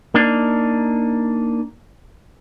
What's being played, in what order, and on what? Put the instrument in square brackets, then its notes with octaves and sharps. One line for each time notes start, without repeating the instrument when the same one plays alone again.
[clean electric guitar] A#3 D4 D#4